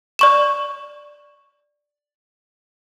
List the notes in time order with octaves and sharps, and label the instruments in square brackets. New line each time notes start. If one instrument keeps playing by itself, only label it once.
[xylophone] D5 C#6 E7